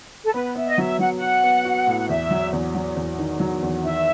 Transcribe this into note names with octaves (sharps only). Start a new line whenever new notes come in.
A4
B3 B4
B3 E5
D#5
F#3 E5
F#3 F#5
F#4 F#5
B3
F#4
A2
F#5
E2 E5
F#3
E2
F#3
E2
D#3
F#3
E2
D#3 E5